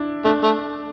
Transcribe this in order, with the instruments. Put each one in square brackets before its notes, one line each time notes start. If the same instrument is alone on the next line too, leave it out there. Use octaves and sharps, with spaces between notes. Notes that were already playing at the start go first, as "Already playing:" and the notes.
Already playing: [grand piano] D4 E4
[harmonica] A3 [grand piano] D4
[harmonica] A3